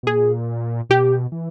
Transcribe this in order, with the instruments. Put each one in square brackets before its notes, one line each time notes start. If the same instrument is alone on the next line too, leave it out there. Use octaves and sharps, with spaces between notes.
[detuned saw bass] B2
[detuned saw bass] A#2 [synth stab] G#4
[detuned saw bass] B2 [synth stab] G4
[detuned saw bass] E3